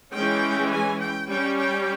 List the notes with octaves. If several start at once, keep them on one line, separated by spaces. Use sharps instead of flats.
E3 G#3 C#4 G5
G#5
G5
G3 C#4 G5
G5